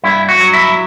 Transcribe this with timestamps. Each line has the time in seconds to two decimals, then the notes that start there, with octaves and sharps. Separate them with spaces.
0.04 G2 E4
0.29 F#4
0.40 F#3
0.53 E4